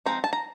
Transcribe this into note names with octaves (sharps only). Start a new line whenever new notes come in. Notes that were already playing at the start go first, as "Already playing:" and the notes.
F3 G#3 C4 D#4 A#5
A5
A#5